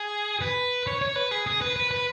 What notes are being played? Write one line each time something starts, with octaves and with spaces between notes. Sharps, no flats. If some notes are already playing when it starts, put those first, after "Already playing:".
Already playing: G#4
B4
C#5
C#5
B4
G#4
G#4
B4
B4
B4